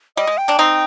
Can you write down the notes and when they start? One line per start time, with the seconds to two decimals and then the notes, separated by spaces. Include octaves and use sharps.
0.17 G3 D#5
0.27 G#3
0.38 G5
0.48 A#3 D4
0.59 C4 D#4